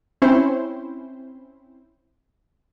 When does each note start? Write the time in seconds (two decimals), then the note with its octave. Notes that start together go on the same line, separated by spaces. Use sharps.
0.22 C4 C#4 E4 C5